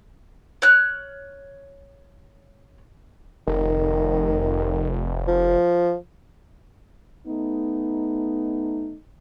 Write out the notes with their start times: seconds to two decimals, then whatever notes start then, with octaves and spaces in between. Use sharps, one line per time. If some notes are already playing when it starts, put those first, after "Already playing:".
0.62 C#5 F6 F#6
3.47 F1 D#3
5.28 F3
7.27 A3 B3 D#4